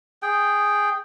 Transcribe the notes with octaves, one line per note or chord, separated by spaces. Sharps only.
G#4 G5